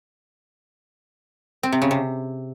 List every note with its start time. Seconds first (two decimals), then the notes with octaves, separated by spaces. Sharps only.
1.63 C4
1.73 C3
1.82 C#3
1.91 C3